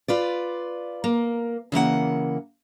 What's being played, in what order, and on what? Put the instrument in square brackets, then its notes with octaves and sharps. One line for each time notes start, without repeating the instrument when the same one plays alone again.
[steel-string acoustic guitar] F4 B4 D5
A#3
C#3 E3 A#3 F#5